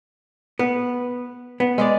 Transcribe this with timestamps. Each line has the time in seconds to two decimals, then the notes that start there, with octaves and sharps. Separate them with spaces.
0.59 B3 B4
1.60 B3
1.78 G#3 G#4 D5